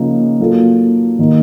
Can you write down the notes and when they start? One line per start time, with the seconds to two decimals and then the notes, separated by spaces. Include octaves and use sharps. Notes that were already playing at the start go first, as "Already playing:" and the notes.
Already playing: C#3 F3 A#3 D#4
0.40 F#3 A#3 F4 A4
1.19 D#3 A#3 D#4